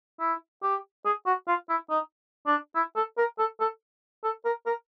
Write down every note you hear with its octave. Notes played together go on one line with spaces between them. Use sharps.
E4
G4
G#4
F#4
F4
E4
D#4
D4
E4
A4
A#4
A4
A4
A4
A#4
A#4